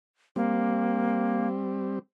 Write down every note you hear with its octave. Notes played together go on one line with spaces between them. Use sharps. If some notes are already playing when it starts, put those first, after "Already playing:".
G3 A#3 C4